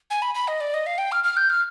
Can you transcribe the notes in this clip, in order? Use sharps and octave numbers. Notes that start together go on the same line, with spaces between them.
G#5
B5
B5
D#5
D5
D#5
F5
G5
F6
F6
G6
F6